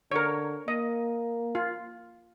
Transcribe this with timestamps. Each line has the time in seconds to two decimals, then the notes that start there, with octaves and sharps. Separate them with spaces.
0.12 D3 A#4 C#5
0.68 A#3 D#5
1.55 F4